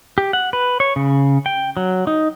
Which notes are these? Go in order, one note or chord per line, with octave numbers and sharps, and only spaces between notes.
G4
F#5
B4
C#5
C#3
G5
F#3
D#4